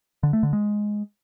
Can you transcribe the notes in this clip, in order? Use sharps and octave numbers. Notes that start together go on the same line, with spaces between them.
D3
A3
D3
G#3